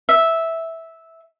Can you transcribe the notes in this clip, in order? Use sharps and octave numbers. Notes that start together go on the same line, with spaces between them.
E5